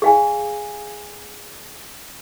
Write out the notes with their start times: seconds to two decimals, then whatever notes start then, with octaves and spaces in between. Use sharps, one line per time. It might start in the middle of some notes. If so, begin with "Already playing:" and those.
0.02 G#4 F5 G#5